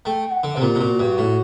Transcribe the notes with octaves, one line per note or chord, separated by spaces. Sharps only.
A3 G5
F#5
D3
C3 G4
A#2
C3
A#2 F#4
G2
A2